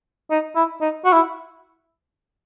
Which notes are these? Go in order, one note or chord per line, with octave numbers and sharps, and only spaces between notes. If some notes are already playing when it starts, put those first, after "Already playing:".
D#4
E4
D#4
F#4
E4